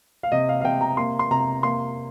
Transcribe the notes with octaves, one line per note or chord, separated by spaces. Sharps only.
F5
C3 D#5
F5
F5
C3 G5
A#5
A#3 C6
C6
C3 A#5
A#3 C6